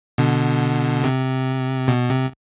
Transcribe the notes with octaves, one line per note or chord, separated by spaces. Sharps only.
B2 D3
C3
B2
C3